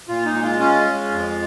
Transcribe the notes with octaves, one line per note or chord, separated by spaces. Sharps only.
A#2 F4
D#4
G#3
F4
C#4 F4
G#3
F2